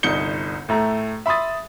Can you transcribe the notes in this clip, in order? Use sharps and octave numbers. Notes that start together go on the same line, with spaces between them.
G1 C2 D#4 G6 C#7 G7
A2 A3 A#5
E5 B5 C6 D#6 A6